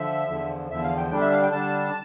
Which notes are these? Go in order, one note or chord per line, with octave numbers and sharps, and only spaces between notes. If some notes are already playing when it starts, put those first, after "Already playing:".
Already playing: D3 F3 E5
E2 D3 F3
E2 D3 F3 E5
F5
G5
D3 G3 D4 G5
E5
F5
G5
D3 G3 D4 A5